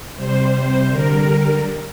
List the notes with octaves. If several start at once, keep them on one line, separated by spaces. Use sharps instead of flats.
C3 G3 C5
C5
D3 G3 A#4